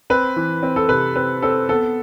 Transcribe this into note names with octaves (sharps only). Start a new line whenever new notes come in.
C4 B4
E3
C4
A4
C3 B4
C4 B4
C4 A4
B3 A4